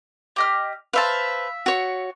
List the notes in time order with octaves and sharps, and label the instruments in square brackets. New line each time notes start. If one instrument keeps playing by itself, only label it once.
[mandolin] G4 D#5 F6
[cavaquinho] B4 C5 A5 [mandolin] E5 F5
[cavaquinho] F#4 C#5